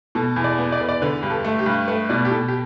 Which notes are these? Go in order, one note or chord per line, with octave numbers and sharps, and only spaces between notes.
B2 A4
E2
D5
B3
D5
E2 B4
D5
D3 B4
G2
A4
A3
G4
G2
A3 B4
B2 D5
G4
B2 A4
G4